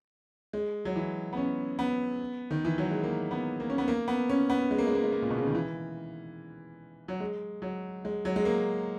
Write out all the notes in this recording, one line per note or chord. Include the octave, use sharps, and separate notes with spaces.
G#3
F#3
E3
B3
C#4
B3
D#3
E3
F#3
G#3
A#3
B3
A#3
C#4
B3
A#3
B3
C#4
B3
G#3
A#3
G#3
A#3
G#3
A#3
A#2
B2
C#3
D#3
E3
F#3
G#3
F#3
G#3
F#3
G#3
A#3